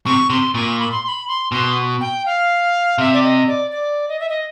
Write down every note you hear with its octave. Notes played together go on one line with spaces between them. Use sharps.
C3 C#6
C3 C6
A#2 C#6
B5
C6
C6
B5
C6
B2 C6
G5
F5
C3 E5
D5
D#5
D5
D5
D#5
E5
D#5